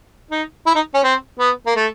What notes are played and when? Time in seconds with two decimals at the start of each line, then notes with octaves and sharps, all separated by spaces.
0.31 D#4
0.66 E4
0.75 D#4
0.94 C#4
1.03 C4
1.39 B3
1.66 A#3
1.76 A3